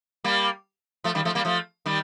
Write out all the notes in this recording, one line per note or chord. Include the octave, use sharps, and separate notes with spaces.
G3 A#3
F3 A3
D#3 G3
F3 A3
G3 A#3
F3 A3
D#3 G3